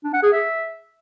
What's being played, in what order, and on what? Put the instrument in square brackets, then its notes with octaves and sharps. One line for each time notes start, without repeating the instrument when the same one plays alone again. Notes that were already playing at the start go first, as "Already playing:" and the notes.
[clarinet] D4
F#5
G#4
E5